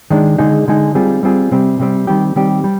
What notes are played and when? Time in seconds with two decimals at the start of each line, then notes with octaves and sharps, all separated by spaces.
0.10 D#3 G#3 D4
0.38 D3 G#3 D#4 G#4
0.68 D3 G#3 D#4 G#4
0.95 G3 C4 F4 G#4
1.23 G3 C4 F4 G#4
1.52 C3 G3 C4
1.80 C3 G3 C4
2.07 D#3 G3 C4 G4
2.36 D#3 G3 C4 G4
2.64 G3